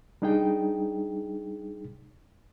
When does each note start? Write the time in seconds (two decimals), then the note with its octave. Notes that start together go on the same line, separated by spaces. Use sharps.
0.22 G3 D4 D#4 G#4 G5